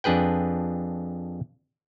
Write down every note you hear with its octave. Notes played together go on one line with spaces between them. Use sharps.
F2 D4 G#4 B4 G5